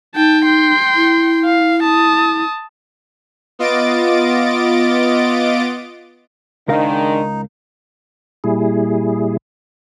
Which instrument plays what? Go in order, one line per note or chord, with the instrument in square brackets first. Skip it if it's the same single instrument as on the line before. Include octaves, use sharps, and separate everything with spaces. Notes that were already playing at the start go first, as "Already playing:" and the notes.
[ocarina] D#4 [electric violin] G5 A5
[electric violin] G5 C6
[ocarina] E4
[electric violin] F5
A5 D#6
[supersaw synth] B3 F4 D#5 D6 A6 D7
[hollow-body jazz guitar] C#2 A#4 F5 [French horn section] G#2 D#3 [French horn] D4 [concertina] D#4
[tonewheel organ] A#2 G3 E4 G#4